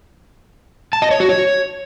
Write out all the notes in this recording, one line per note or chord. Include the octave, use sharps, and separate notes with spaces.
A5
D#5
C#5
F#4
C#5